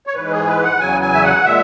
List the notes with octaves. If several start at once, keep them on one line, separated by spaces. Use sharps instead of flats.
C#5
G#2 E3 G#3 B4
G#4
B4
F#5
E2 C#3 F#3 G#5
G#5
E5
F#5
A#2 G#3 E5